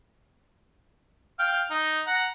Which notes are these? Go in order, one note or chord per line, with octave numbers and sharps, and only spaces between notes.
F5 G5 F6
D#4
F#5 A#5